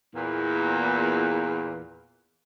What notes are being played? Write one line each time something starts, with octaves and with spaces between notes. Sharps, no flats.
E2 A#2